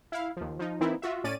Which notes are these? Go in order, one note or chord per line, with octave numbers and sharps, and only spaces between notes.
E4 F5
D#2 F3
F3 D#4
E3 A#3 C4 D#4 E4
F4 F#4 E5
A2 C#4 D5 A6 D#7